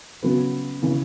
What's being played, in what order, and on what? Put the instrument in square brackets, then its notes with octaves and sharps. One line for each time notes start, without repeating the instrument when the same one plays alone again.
[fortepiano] C#3 F#3 B3
C#3 E3 C#4